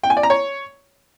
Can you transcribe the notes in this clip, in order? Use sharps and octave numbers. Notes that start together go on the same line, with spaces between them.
G5
G#5
D5
A#5
C#5